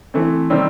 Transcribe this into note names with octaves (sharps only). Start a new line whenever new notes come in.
E3 A3 C4
C3 D#3 G3 C4